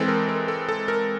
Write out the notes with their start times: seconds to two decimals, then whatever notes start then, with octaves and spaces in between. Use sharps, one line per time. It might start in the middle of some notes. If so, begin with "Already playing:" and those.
Already playing: E3 G#3 C4 A4
0.08 A#4
0.29 A#4
0.48 A4
0.69 A4
0.88 A#4